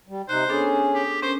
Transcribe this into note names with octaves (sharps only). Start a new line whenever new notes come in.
G3
C3 D#4 C5 F#6
B3 C#4 D4 G#4 A4
G4
C#4 A#4 C5